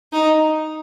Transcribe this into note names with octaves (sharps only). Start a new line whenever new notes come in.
D#4